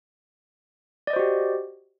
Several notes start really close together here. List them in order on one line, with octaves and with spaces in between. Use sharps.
D5 D#5 C5 F#4 G4